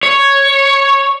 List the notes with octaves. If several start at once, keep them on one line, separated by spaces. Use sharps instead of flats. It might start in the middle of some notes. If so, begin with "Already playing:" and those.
C#5